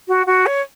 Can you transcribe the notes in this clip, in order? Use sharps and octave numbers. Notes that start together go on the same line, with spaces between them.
F#4
F#4
C#5